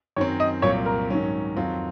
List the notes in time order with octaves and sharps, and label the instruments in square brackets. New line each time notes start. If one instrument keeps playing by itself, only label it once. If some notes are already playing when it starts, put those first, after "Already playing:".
[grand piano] F#2 D#3 F#3 C4 [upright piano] C#5
[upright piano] D#5
[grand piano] C2 A#2 F#3 C4 F4 [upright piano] C#5
[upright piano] A#4
[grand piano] G#2 D#3 F#3 C#4
F2 D#3 F#3 C4 F4